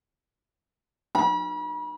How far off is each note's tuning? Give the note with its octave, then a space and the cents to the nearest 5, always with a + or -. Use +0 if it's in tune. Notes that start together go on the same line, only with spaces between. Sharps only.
B5 -40